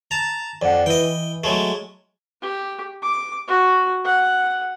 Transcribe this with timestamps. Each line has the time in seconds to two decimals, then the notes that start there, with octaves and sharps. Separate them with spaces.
0.11 A5 A#5
0.62 F2 D5 F#5
0.86 E3 D#5 G5
1.44 F#3 G#3 A3
2.42 G4
3.03 D6
3.48 F#4
4.05 F#5